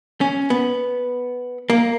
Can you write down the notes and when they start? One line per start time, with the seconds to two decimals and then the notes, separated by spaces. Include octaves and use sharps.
0.21 C#4
0.50 B3
1.70 A#3